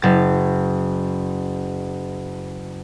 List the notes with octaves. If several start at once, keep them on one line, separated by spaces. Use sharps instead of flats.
F#1 A6